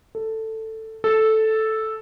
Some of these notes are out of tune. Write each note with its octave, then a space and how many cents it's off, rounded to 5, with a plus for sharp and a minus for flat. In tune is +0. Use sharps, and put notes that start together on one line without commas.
A4 +10
A4 -5